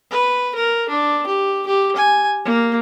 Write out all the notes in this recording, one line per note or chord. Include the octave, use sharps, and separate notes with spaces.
B4
A#4
D4
G4
G4
G#5
A#3